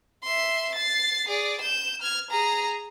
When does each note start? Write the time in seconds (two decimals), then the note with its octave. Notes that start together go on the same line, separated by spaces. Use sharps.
0.23 E5 C6
0.75 A6 C7
1.28 G#4 D5
1.61 G6 E7
2.01 F6 G#6
2.31 G#4 A#5